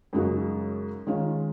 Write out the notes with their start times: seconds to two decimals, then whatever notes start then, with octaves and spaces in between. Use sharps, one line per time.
0.13 F#2 C#3 G#3 D#4 F#4
1.07 D#3 G#3 C#4 F4